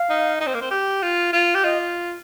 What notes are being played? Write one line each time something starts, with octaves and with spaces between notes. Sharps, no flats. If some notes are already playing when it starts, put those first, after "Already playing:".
Already playing: F5
D#4
D#4
C4
A#3
C4
G4
F4
F4
G4
F4 D#5